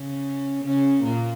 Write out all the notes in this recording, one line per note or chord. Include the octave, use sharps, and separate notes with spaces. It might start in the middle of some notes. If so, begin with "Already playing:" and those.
Already playing: C#3 C#4
C#3 C#4
A#2 A#3